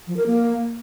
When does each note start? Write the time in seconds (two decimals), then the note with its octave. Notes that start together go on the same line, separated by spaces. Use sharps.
0.07 F3
0.17 A#4
0.26 A#3